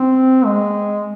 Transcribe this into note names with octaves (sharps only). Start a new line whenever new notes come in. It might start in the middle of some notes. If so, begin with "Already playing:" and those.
Already playing: C4
G#3